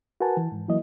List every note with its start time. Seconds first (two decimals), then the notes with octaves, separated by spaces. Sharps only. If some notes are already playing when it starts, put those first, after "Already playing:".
0.21 F#4 A#4 B4 F#5 G#5 A5
0.37 E3
0.52 G#2
0.68 E3 F#3 A#3 E4 D#5